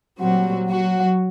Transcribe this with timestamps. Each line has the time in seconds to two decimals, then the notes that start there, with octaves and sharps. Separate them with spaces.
0.20 A#2 F#3 G3 C4 F#4
0.69 F#3 F#4